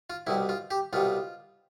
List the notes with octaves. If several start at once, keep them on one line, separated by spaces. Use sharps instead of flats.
F4
C2 B2 G3 E4
F4
G4
C2 B2 G3 F4